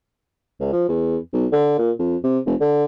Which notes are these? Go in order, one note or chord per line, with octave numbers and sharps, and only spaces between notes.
C#2
F3
E2
B1
D3
A#2
F2
C3
F1
D3